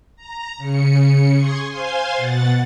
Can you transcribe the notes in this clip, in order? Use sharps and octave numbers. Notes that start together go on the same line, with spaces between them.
A#5
C#3 C#7
G#4 G#5 C6 C#6 D#6
C5 F5 G#5 C6
B2 F#5 A6